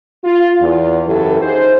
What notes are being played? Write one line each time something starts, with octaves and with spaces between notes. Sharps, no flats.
F4
E2
F#2 C#3 E3 G4 A4
D#4 G#4 C5